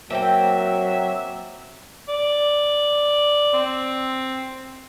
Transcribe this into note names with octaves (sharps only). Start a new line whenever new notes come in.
F#3 A#3 C4 E5 G5
D5
C4